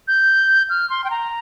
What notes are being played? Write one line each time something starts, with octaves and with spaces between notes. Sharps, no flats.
G6
F6
C6
G5
A#5